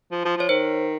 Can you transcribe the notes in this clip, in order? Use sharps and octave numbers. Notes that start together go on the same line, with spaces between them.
F3
F3
F3 C#5
D#3 C5